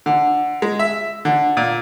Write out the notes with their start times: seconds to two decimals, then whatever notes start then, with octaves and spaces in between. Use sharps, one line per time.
0.06 D3
0.62 G#3
0.79 E5
1.25 D3
1.57 A#2